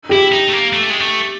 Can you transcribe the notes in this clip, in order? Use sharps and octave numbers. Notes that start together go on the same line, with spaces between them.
E4 G4
D#4
A3
A#3
A3
G#3
A3